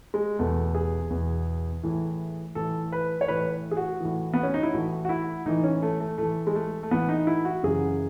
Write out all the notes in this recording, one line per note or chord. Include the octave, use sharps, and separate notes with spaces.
G#3
E2 B2 A3
G#4
E2 B2
A2 E3
A2 E3 A4
B4
C#5
A2 E3 B4
G#4
F#4
A2 E3
B3
C#4
D#4
E4
A2 E3 F#4
F#4
E4
A2 E3 D#4
C#4
A3
A3
A2 E3 A3
G#3
A3
A3
A2 E3 B3
D#4
E4
F#4
F#2 C#3 E3 G#4